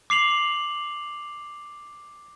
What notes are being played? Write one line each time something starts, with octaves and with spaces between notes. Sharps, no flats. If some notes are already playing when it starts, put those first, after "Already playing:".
D6 C7 F7 F#7